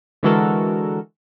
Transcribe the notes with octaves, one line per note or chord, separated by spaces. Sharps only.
D3 E3 G#3 F#4 A4 A#4